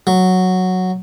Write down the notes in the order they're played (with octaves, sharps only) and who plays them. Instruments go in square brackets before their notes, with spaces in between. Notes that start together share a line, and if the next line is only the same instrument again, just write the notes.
[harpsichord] F#3